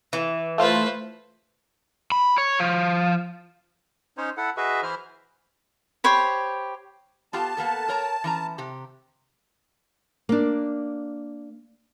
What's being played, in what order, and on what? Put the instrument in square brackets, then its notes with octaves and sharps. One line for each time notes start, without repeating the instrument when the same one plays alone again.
[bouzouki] E3
[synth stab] A3 F4 [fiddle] B4 C5
[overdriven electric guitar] B5
C#5
F3
[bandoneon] C#4 D#4 C5 C#5
E4 A4 F#5
F#4 G#4 B4 D#5 E5
E3 E4 C5 F6
[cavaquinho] G4 C5 C#5 B5
[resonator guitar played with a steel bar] B3 F4 G4 [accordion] A5
[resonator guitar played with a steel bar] A#3 B3 A4
A#4 C#5 A#5
E3 C#4 A#5
C3 G4
[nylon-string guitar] A#3 D4